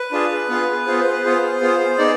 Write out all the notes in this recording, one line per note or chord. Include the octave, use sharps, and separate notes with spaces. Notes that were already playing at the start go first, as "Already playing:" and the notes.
Already playing: B4
D4 F4 G#4
B3 F4 G#4
B3 F4 G#4 C5
C5
B4
B3 F4 G#4 C5
B3 F4 G#4
B3 D#4 G#4 D5